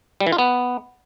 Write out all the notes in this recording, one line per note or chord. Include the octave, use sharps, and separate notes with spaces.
G3
E3
F4
B3